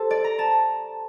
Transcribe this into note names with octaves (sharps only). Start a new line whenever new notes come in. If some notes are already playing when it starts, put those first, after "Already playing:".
Already playing: G4 A4 C5
D5
A#5
A5